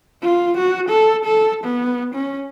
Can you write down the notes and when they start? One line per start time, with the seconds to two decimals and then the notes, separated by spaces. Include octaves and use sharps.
0.22 F4
0.58 F#4
0.89 A4
1.25 A4
1.64 B3
2.15 C#4